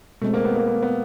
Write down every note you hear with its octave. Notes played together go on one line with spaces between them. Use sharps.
B2 G#3 A3 C4
A#3
B3
A#3
B3
B3